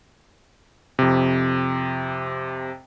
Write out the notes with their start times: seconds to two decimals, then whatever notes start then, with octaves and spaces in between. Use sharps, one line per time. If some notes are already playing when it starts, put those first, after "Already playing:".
0.99 F2 C3